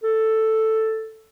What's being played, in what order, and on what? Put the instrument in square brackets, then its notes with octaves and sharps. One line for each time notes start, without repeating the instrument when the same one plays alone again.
[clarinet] A4